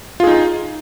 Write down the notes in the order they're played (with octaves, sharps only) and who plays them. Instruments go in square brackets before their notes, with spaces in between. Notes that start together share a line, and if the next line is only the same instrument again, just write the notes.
[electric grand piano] F4
G#4
D#4